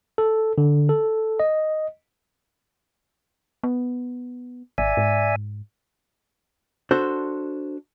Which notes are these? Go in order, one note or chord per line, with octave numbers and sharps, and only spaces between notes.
A4
D3
A4
D#5
B3
G#1 D5 E5 G#5
G#2
D4 F#4 A4 C5